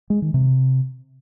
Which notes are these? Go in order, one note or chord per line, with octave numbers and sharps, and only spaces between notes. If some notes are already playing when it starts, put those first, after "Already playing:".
G#3
D#3
C3